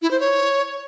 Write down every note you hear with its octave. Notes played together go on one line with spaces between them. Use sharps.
E4
C5
C#5